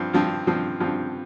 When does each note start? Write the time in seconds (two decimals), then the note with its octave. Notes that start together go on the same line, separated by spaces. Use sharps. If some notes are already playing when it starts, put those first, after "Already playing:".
Already playing: G2 F3 C4
0.13 G2 F3 C4
0.47 G2 F3 C4
0.80 G2 F3 C4